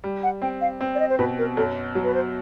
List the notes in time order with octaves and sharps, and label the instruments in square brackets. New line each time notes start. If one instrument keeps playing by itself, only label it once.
[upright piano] G3
[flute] F#5
[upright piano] C4 [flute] G5
[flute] F5
[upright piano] C4
[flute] D5
D#5
C5
[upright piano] B2 [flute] B4
[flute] A#4
[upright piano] F#2 [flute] A4
[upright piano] F#3
[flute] B4
C5